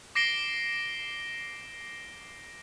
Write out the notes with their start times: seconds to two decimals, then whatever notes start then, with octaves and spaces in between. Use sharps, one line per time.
0.15 D6 A#6 C7 D7 G7